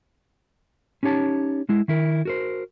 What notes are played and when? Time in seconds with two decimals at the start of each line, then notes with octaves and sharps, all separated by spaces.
1.03 C#4 D#4 G4 C#5 A5
1.69 G#3 E4
1.88 D#3 E4 A#4
2.25 F#4 A#4 C5